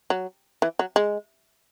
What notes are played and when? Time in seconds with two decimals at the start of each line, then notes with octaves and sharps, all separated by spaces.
0.10 F#3
0.62 E3
0.79 F#3
0.96 G#3